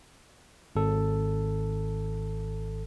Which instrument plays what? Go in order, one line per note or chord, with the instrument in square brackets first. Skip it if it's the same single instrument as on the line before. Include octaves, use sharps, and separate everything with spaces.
[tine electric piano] G#1 A4